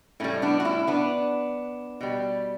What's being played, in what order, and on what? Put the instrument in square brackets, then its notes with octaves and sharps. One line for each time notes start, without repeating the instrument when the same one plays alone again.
[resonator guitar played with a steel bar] A2 G3 A3 C#4
B3 D4
F#4
C#4 E4
B3 D4
B2 G3